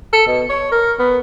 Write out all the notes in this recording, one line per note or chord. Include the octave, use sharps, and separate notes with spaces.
A4
B2
C#5
A#4
B3